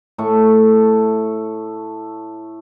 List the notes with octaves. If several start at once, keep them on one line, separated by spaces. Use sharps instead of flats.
A2 A3 A4 C#6